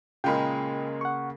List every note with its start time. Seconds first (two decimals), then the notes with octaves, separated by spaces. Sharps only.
0.24 A#2 C#3 G#3 A#3 F4 G5 B5
1.01 F#5 C#6